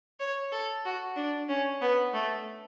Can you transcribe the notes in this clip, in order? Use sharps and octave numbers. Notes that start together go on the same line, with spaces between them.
C#5
A4
F#4
D4
C#4
B3
A3